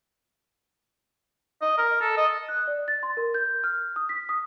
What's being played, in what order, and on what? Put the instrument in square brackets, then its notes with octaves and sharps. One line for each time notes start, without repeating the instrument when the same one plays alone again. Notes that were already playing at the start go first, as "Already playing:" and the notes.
[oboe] D#5
A#4
A4
D#5
[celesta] F#6
D5
A6
C6
A#4
G6
F6
D#6
B6
D#6